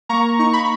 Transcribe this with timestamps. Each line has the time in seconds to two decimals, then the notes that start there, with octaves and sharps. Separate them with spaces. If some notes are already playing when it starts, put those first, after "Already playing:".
0.09 A#3 A#5 C#6
0.39 D#4 C#6
0.53 B5